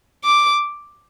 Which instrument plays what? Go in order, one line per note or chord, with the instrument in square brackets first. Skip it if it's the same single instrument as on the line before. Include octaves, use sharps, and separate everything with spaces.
[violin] D6